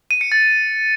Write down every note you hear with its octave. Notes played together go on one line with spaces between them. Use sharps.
D#7
C#7
A6